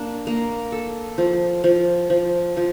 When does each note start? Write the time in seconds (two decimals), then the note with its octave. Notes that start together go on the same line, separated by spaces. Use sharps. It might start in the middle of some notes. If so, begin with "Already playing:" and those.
Already playing: A#3 D4
0.27 A#3
0.72 A4
1.18 F3
1.64 F3
2.10 F3
2.57 F3